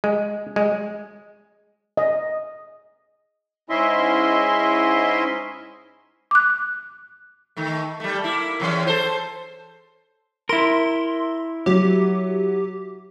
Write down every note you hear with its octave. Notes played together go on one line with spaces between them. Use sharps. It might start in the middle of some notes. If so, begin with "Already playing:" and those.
G#3
G#3
D#5
G#2 C#4 E4 D#5 E5 C6
D6 F#6
D#3 A3
G3 A3
A#3 E4
E2 E3 C#4
A4 C5
E4 A#4 C6
F#3 G4